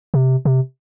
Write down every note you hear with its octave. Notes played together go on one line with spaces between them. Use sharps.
C3
C3